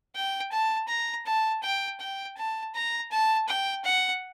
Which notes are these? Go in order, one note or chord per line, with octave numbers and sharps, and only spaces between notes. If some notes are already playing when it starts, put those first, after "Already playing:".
G5
A5
A#5
A5
G5
G5
A5
A#5
A5
G5
F#5